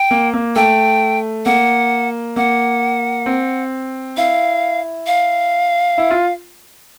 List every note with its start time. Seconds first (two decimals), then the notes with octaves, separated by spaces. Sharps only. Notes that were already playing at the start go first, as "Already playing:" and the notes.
Already playing: G5
0.11 A#3
0.34 A#3
0.56 A3 G5
1.46 A#3 F#5
2.36 A#3 F#5
3.26 C4
4.17 E4 F5
5.07 F5
5.98 E4
6.11 F4